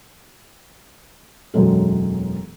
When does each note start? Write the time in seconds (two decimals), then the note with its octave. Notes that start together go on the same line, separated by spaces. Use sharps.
1.54 E1 F#2 F#3 G#3 A4